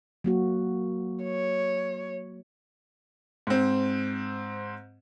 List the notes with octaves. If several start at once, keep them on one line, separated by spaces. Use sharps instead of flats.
F#3 A#3 F#4
C#5
G#2 C4